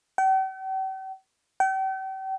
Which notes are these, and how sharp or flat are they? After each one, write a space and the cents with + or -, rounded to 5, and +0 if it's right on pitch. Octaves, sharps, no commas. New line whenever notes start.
G5 -45
G5 -40